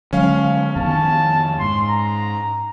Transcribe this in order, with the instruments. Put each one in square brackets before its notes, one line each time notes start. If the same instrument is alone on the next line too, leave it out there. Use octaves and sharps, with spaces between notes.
[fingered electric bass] D3 F#3 G#3 [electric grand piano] C#4 F5
[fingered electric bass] F2 D#3 B3 [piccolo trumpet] A5
[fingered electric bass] G#2 [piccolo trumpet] C6
[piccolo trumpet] A#5